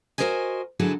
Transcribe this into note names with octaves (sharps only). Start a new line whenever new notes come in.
F#4 G#4 A#4 C5 D#5 G#5
D3 F#3 E4 F#4 G#4 A4